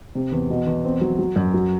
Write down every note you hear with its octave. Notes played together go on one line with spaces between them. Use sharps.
C3
E2
B2
E2
C4
F#3
F#3
F#2
F#3